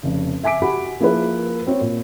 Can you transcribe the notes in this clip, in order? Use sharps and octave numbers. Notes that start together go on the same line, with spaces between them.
F1 C#3
E5 G#5 D6 B6 D7
F#4 G4 F#5 B5 D6
F3 A#3 E4 G#4 A#4 B4
C4 F#4 C#5
A#2